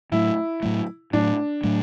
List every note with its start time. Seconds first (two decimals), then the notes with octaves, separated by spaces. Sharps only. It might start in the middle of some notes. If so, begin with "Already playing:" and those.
0.12 A2 F#3 A3 E4
0.63 A2 F#3 A3
1.13 A2 F#3 A3 D4
1.64 A2 F#3 A3